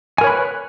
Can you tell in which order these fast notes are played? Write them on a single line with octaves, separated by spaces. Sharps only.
G#5 A#4 C#5 B5 B4